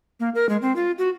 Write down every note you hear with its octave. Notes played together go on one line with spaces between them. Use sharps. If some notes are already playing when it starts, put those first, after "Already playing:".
A#3
A#4
G#3
C4
F4
F#4